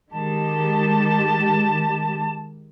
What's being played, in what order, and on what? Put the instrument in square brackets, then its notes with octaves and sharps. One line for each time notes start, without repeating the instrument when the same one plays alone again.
[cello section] D#3 G#3 G4 [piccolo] A5